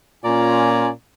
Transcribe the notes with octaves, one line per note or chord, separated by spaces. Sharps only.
A#2 C#4 F4 D5 G#5 A#5